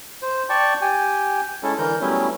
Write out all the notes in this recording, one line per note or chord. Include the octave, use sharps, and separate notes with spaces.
C5
D5 G5 A5 C#6
G4 G5 G#5
G#3 C#4 E4 A4
D3 E3 A#4 G6
F#3 G3 A3 B3 C#4 E4